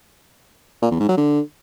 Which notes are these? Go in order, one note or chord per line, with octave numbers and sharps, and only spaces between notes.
A#2
E2
G#2
F#3
D3